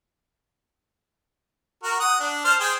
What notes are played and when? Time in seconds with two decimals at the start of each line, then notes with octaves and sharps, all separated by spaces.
1.83 F#4 A#4
2.00 F#5 D#6
2.20 D4
2.45 C5 A5 F6
2.60 G#4 C5 G5